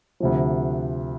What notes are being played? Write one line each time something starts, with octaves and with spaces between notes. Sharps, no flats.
D2 C3 F3